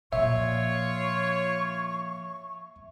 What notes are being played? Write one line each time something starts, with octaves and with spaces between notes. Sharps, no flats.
A#2 F3 F4 C#5 E5 C#6